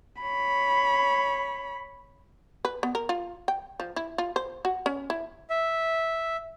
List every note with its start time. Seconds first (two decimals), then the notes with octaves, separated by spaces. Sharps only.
0.23 C#5 B5
2.65 B4
2.83 B3
2.95 A#4
3.09 F4
3.48 G5
3.80 F3
3.96 E4
4.18 F4
4.36 C5
4.65 F#4
4.86 C#4
5.10 E4
5.50 E5